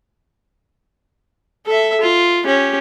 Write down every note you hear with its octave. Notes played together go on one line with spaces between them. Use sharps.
A4 E5
F4
C#4 G4